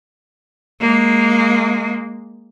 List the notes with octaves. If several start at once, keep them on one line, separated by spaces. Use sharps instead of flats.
G#3 A#3